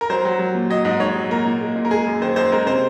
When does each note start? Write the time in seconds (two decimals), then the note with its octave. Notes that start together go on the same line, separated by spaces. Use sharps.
0.01 A#4
0.10 F#3 C5
0.25 F#3
0.39 F#3
0.55 A#2
0.70 F#3 D#5
0.85 G#2 D#5
1.00 G#2 C#5
1.16 F#3
1.31 A#2 A#4
1.45 A#2
1.61 G#3
1.76 A#2
1.85 A#4
1.91 G#3 G#4
2.07 F#2
2.21 D#3 C5
2.36 F#2 C5
2.52 G#3 A#4
2.66 C3 C5